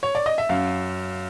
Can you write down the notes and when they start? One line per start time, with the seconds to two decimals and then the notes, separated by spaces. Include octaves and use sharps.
0.03 C#5
0.15 D5
0.26 D#5
0.38 E5
0.49 F#2 F5